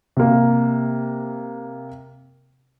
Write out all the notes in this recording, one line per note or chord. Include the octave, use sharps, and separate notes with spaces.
C3 A#3